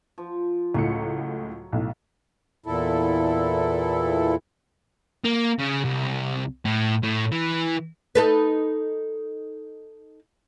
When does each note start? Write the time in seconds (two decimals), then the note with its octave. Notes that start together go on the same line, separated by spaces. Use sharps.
0.18 F3
0.74 C#2 A2 F#3 C#7
1.72 B1 A2
2.66 E2 A#2 E4 A4
5.25 A#3
5.59 C#3
5.85 C2
6.65 A2
7.03 A2
7.32 E3
8.15 D#4 A4 B4